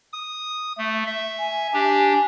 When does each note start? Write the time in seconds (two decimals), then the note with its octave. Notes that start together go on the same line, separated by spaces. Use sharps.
0.13 D#6
0.78 A3
1.06 E5
1.39 G#5
1.73 D4 G4